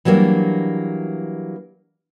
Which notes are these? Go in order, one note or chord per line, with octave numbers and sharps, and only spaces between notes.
E3 F#3 G3 A#3 D4